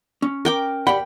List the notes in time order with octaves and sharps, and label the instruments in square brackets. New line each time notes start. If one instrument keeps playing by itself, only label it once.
[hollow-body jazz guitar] C#4
[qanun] A#4 G5 D6
[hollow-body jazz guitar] G4 D5 F#5 [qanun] G5 [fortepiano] B5